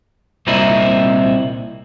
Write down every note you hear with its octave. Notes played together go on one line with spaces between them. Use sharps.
C2 A#2 C4 D#4 E4